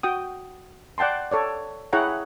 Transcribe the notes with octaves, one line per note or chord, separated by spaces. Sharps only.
F#4 G5 D#6
D5 F#5 G5 A5 C6
A4 C#5 D5
E4 G#4 C#5 F#5 G5 A#5